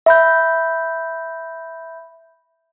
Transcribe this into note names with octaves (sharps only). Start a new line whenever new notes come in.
E5 B5 G6